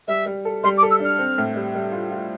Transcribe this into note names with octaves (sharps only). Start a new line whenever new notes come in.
G3 E5
G3
A4
G3 C6
D6
A4
E6
D4 F6
C4
A2
G3
G3
F4
F4